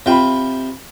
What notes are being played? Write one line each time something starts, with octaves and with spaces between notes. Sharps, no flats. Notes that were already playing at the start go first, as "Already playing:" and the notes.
C3 F4 G5 B5